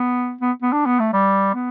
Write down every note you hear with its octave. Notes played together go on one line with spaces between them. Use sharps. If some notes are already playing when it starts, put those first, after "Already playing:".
Already playing: B3
B3
B3
D4
B3
A3
G3
B3